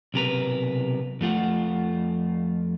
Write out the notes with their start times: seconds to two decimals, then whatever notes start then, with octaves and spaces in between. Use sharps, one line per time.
0.14 B1 C3 A#4 B4
1.21 F2 A3 F4 F#5